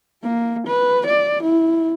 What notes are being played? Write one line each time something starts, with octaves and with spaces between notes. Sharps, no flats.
A#3
B4
D5
E4